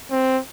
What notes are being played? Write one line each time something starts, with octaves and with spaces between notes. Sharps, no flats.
C4